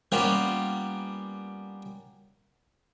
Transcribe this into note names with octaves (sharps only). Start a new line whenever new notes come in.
G3 A#3 B3 C#4 F4